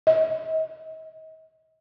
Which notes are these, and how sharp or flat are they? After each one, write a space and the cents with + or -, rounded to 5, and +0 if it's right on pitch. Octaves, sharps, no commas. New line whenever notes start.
D#5 +40